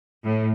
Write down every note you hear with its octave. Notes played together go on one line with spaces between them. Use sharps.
A2